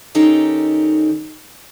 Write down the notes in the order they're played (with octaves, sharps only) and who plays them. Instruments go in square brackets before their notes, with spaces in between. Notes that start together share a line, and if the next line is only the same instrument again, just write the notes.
[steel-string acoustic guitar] D#3 C#4 D#4 G4 A4 D5